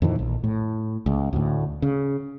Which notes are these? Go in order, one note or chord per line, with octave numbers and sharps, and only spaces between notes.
F2 A#2 D#3 E3
A#1
A2
C#2
D2 A2
C#3